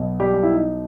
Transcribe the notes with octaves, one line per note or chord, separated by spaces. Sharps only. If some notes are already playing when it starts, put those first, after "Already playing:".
Already playing: B1 B2
G3 G4
G4
E4
D#4